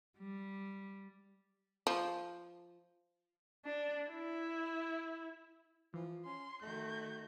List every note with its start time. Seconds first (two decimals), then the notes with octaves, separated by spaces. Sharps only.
0.18 G3
1.87 F3
3.65 D4
4.10 E4
5.94 E3 F3
6.25 C#4 C6
6.62 D#3 A3 F#4 G6